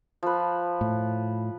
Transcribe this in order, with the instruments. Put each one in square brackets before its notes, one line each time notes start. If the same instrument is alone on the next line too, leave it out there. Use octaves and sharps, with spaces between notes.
[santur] F3 B4
[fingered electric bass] A2